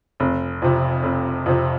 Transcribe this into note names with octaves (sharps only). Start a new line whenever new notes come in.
F1
F2 C3
F1
F2 C3